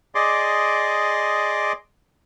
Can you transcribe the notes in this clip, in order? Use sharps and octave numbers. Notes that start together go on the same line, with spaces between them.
G#4 D5 D#5 C6 D6